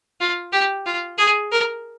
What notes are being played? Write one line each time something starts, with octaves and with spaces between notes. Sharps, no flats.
F4
G4
F4
G#4
A#4